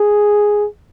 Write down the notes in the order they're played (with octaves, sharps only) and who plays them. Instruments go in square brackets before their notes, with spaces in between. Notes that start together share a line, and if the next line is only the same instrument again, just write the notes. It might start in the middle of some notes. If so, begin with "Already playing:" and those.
Already playing: [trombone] G#4